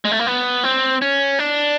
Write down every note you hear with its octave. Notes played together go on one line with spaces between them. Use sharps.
G#3
A3
A#3
B3
C4
C#4
D4